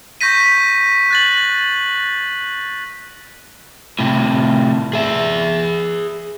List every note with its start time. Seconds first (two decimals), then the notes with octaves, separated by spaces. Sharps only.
0.21 C#6 G6 A#6 B6 D#7
1.10 F#6 A6 F#7
3.99 A2 C3
4.93 G#4 E5